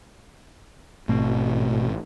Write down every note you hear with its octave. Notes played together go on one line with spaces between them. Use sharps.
A1 G#2 B2 A3 C4